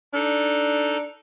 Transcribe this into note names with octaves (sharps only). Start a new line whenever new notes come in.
D4 D#4 A4